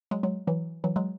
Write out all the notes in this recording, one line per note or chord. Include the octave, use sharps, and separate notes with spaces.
F#3 G#3
F#3 G#3
E3 F#3
E3 F#3
F#3 G#3